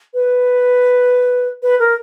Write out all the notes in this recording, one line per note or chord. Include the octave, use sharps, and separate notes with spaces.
B4
B4
A#4